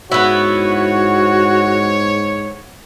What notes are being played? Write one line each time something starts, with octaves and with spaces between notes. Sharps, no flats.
G#2 B3 E4 F#4 C#5